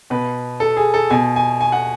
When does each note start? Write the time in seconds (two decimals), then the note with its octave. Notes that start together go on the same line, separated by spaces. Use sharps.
0.10 B2 B4
0.60 A4
0.77 G#4
0.94 A4
1.10 B2 G#5
1.36 G#5
1.61 G#5
1.72 F#5